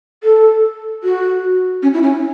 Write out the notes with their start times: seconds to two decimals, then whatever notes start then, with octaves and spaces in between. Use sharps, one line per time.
0.24 A4
1.04 F#4
1.83 C#4
1.94 E4
2.03 C#4